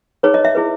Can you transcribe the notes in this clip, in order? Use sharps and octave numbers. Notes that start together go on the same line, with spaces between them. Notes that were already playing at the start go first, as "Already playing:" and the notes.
D#4 G#4 B4 C#5
D#5
E5
E4 G#4 B4